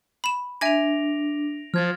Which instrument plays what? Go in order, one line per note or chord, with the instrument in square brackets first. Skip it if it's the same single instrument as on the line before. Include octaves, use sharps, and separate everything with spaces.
[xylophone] B5 E7
[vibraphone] D4 [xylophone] E5 G#5 G#6 [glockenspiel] A#6 D7 F7
[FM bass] F3 [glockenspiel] F6 G#6 A6